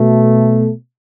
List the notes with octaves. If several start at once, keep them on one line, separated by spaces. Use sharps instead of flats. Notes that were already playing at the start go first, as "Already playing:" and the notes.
Already playing: B2 A3